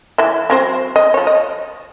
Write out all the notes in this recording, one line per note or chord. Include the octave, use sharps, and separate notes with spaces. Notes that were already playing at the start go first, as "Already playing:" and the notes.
E3 E5
F#3 C4 C5
D#5
F3 C#5
D#5